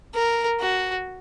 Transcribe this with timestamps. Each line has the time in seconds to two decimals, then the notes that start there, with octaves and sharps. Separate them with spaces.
0.15 A#4
0.61 F#4